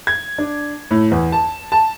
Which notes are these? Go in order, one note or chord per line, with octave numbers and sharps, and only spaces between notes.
G#6
D4
A2
E2
A5
A5